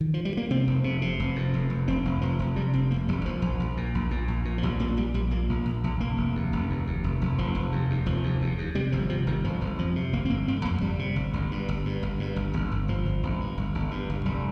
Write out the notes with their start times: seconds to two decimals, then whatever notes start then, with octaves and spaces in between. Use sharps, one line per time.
0.01 D#3
0.14 F3
0.25 G3
0.37 A#3
0.50 C3 C4
0.67 F1
0.84 C3
1.02 C3
1.19 F1
1.36 F2
1.54 F1
1.70 F1
1.88 F1 C4
2.05 F1
2.21 F1 F3
2.39 F1
2.56 C3 G3
2.73 F1 C4
2.90 F1 A#3
3.08 F1 G3
3.25 A#1 F3
3.42 A#1
3.60 A#1
3.77 A#2
3.95 A#1
4.11 A#2
4.28 A#1
4.45 A#2
4.58 F3
4.63 A#1 G3
4.80 A#2 A#3
4.97 A#1 G3
5.14 A#1 G3
5.31 A#2 A#3
5.49 A#1
5.65 A#1
5.84 A#1
6.00 F1 A#3
6.17 F1
6.35 D#2
6.52 F1
6.70 D#2
6.87 D#2
7.04 F1
7.21 F1
7.38 F1 F3
7.55 F1
7.72 D#2
7.90 D#2
8.06 F1 F3
8.24 D#2
8.42 D#2
8.58 D#2
8.75 C3 G3
8.92 G1 F3
9.09 C3 F3
9.27 G1 D#3
9.44 G1 F3
9.61 G1
9.79 F2 F3
9.96 C3
10.13 G1 A#3
10.25 C4
10.30 G1 A#3
10.48 G1 C4
10.65 F2 A#3
10.81 G1 G3
10.99 C3
11.16 G1
11.33 G1
11.51 G2
11.69 G1
11.85 G2
12.03 G1
12.19 G2
12.36 G1
12.53 G1
12.71 G1
12.88 G1 F3
13.05 G1
13.23 G1
13.40 G2
13.57 G1
13.75 G1
13.91 G2
14.09 G1
14.25 F1 G3